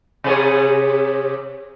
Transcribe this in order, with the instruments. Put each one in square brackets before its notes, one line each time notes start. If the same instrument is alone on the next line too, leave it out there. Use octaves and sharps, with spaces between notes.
[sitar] C3 G#4 C#5